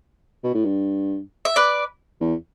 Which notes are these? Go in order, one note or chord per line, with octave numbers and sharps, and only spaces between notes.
B2
A2
G2
E5
B4 D5
E2